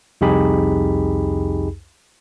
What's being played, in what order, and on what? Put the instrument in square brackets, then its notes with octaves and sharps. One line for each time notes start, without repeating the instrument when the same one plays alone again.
[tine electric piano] C2 F2 D#4 G4 G#4 B5